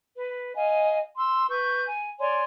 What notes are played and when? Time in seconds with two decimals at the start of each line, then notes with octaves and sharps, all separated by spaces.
0.17 B4
0.55 D#5 F5 G#5
1.17 C6 E6
1.49 B4 C#6 G6
1.87 G#5
2.20 C#5 D5 G#5 C6